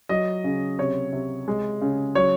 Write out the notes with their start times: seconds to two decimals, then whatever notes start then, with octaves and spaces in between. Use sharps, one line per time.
0.09 F#3 D#5
0.44 C#3
0.78 C3 C#5
1.13 C3
1.48 G#3
1.81 C#3
2.15 F#3 C#5